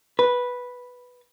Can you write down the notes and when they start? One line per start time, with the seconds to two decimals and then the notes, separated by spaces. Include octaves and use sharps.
0.19 B4